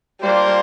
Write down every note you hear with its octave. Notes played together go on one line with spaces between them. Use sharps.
G3 A#3 D4 F4 C5